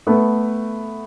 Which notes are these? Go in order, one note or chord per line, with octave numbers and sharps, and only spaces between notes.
A3 B3